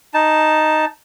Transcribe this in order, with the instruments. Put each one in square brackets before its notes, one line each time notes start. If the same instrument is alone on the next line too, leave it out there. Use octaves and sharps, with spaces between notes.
[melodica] D#4 A5